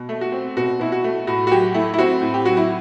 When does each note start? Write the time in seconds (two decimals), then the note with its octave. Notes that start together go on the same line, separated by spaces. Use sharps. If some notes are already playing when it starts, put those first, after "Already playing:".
Already playing: B2
0.09 A3
0.21 F#4
0.32 C4
0.57 B2 F#4
0.79 B2 E4
0.92 F#4
1.04 A3
1.27 A2 F#4
1.47 F#4
1.51 F#3 G4
1.74 A3 E4
1.94 E4
1.99 C4 F#4
2.22 A2
2.34 G4
2.45 F#3 F#4
2.57 E4